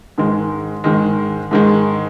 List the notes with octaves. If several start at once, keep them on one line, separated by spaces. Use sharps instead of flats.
G#2 D#3 G#3
G#2 D#3 G#3
G#2 D#3 G#3